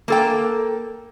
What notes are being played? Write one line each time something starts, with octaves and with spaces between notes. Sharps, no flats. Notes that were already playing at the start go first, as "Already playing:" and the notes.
A#3 A4 G5